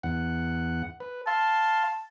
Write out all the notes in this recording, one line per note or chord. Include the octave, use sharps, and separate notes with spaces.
E2 F#5
B4
F5 A5 C6